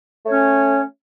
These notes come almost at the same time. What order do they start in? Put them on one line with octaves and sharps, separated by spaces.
A3 C#5 C#4